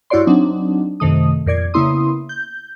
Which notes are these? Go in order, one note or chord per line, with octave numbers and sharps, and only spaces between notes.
G2 E4 F#4 C#5 D5 C6
F#3 C4 D4 D#4
F#2 C3 D#3 A3 D#6
F2 A#2 D5 G#6
C#3 A#3 B3 E4 C6 D#6
G6